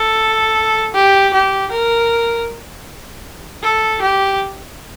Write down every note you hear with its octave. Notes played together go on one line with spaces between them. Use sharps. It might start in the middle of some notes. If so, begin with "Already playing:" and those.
Already playing: A4
G4
G4
A#4
A4
G4